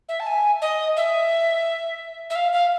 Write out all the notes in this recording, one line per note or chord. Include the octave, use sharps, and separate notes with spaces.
E5
A5
G#5
D#5
E5
E5
F5
F5